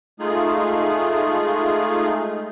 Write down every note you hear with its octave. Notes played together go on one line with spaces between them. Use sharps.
G#3 A3 D#4 F4 G#4